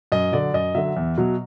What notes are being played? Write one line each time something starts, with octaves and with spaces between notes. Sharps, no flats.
F#2 D#5
D3 F#3 D5
F#2 D#5
D3 F#3 E5
E2
B2 F#3